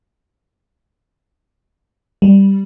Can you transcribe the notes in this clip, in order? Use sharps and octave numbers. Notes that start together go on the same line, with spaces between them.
G3